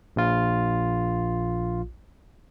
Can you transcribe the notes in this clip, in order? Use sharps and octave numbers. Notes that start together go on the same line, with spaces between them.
A#1 F4